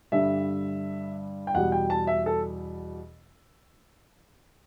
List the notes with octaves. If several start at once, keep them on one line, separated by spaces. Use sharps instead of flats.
G2 D3 G3 E5
G5
E2 B2 G3 F#5
G5
A5
E5
A4